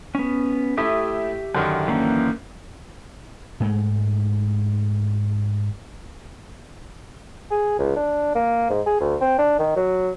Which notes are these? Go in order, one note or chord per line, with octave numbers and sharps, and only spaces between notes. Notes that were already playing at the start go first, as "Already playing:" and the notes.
B3 C#4
A3 E4 G4 E5 D#6
F#2 D3 D#3
E3 A#3 C#4
G#2 G#3 A3
G#4
C#2
D4
A#3
G#2
G#4
D2
C4
D4
D#3
F#3